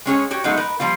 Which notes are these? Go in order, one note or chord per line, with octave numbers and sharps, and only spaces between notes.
G#3 C#4 G#4 C#5
F#4 G4 C#5
F#3 G#3 A3 B3 D#4
A#4 B4
F3 G3 A#3 F4